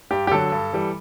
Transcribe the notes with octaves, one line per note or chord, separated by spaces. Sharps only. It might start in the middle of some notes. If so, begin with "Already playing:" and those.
G2 G4
G4
D3 F#3 A4
G2
E3 G3